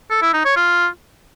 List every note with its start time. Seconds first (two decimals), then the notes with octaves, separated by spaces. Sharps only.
0.11 A4
0.22 E4
0.33 D#4
0.45 C#5
0.56 F4